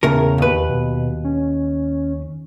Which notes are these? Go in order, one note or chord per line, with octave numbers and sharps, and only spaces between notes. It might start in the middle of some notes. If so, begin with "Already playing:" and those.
E2 A2 C#3 A#4
D#2 B4
B2
C#4